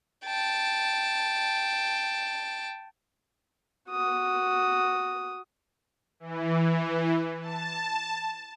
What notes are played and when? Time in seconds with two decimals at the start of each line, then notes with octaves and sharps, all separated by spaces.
0.24 G5 A5
3.90 F#4 D#6
6.20 E3
7.41 A5